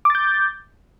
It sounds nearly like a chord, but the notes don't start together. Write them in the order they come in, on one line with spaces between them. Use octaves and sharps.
D6 A6 G6